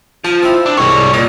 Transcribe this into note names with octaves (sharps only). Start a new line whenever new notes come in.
F3 A5
C4 E4
D4
C2 G#2 G3 C#5
A#2 D#5